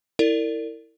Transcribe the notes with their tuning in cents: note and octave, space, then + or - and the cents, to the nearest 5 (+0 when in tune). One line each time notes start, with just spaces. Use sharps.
E4 -10 A#4 -40 D5 +0